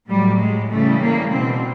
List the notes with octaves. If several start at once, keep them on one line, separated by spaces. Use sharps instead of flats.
A2 F#3 G3
G#3
C#3 E3 G3 A3
A#3
B2 G3 C4